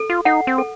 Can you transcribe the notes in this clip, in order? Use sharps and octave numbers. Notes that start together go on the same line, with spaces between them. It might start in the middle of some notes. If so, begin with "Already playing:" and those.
Already playing: A4
F4
D#4 F#5
C4
A4